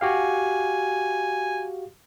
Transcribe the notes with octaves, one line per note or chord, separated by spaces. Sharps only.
F#4 G4 F5 G#5